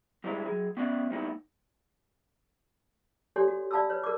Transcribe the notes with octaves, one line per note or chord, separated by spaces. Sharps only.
G2 E3 G3 G#3 E4 A#5
F#3 G#4
B3 C#4 D5 E5 F#5
G3 A#3 B3 D#4 E4
G4 A4 C#5 D5 G#5 C6
F#4
D5 F5 A5 B5 D#6 E6
B4 C#5
A4 A#4 D5 D6